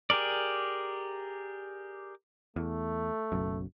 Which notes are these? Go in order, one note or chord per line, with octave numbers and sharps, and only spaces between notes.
G4 G#4 A#4 D5
E2 A3
F#1 B1 F#2